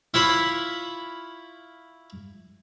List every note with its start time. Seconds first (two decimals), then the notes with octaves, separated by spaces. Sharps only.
0.14 E4 F4 C#5 B5